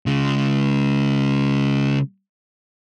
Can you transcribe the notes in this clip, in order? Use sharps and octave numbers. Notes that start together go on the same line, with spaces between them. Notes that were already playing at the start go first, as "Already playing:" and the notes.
C#3 G#3